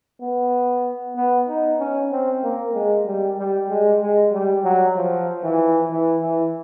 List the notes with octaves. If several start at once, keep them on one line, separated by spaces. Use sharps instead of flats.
B3
B3
D#4
C#4
C4
A#3
G#3
G3
G3
G#3
G#3
G3
F#3
F3
E3
E3
E3